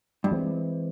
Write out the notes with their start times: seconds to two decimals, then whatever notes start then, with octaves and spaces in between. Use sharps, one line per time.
0.24 G2
0.31 E3 G#3 C4